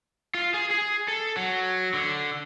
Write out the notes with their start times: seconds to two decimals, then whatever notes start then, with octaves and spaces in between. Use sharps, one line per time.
0.35 F4
0.54 G#4
0.70 G#4
1.08 A4
1.37 F#3
1.94 D3